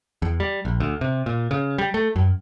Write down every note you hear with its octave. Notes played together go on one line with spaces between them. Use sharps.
E2
G3
A#1
D2
C3
A#2
C#3
G3
A3
F#2